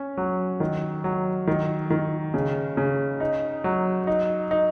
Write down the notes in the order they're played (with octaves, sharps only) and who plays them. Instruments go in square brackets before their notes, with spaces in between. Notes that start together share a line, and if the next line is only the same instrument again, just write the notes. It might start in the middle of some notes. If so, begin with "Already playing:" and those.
Already playing: [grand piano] C#4
F#3
D#3
F#3
D#3
D#3
C#3
C#3
D#4
F#3
D#4
D#4